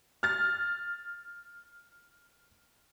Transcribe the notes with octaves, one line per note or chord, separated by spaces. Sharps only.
F6 A6